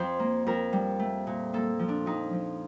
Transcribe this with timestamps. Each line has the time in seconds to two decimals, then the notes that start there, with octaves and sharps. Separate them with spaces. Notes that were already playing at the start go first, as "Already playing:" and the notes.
Already playing: F2 C5
0.20 A#3
0.46 F2 A#4
0.73 G3
1.00 A3
1.27 A#2
1.53 A#3 A4
1.79 F3
1.88 D4
2.06 F2 D#4
2.33 F3